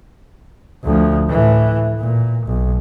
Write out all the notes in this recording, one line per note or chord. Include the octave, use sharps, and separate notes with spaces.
D2 F3
A2 E3
A#2
B1